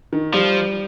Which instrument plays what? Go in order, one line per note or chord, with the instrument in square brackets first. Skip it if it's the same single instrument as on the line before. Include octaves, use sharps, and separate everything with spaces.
[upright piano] D#3
[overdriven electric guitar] F3 [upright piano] G3